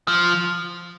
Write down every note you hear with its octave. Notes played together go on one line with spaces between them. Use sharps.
F3